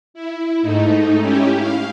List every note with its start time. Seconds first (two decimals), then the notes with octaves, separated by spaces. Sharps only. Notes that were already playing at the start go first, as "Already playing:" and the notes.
0.14 E4
0.61 G#2 A3 D#4
1.20 C#4 E4 G4
1.57 F5